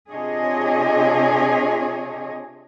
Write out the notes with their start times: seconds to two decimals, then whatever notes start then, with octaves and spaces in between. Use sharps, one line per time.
0.10 C3 D4 F4 G#4 C#5 D#5